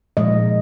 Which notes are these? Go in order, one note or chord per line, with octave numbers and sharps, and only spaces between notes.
A#2 F3 G#3 D#5